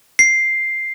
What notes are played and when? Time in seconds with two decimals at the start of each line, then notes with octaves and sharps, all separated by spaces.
0.19 C7